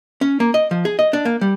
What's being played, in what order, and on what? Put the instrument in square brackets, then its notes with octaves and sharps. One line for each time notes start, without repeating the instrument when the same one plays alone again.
[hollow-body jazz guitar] C#4
A#3
D#5
F3
G#4
D#5
D4
A#3
G3